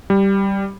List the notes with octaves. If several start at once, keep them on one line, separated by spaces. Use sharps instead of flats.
G3